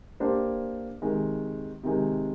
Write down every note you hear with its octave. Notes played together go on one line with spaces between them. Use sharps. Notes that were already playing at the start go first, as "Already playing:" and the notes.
A#3 D4 G4 C5
C3 D#3 G#3
C3 D#3 G#3